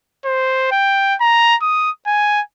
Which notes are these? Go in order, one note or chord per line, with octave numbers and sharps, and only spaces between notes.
C5
G5
A#5
D#6
G#5